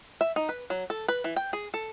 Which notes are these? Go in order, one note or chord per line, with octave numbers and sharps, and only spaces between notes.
E5
D#4
B4
F#3
A4
B4
E3
G5
G#4
A4